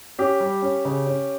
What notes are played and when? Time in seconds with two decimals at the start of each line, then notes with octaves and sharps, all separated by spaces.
0.19 C#4 G4
0.40 G3
0.62 C#4
0.85 C#3
1.06 C#4